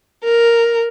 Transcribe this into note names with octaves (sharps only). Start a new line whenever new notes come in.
A#4